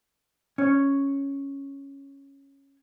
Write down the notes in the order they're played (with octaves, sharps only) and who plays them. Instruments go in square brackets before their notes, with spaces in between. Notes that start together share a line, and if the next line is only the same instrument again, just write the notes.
[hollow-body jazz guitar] C#4 C#5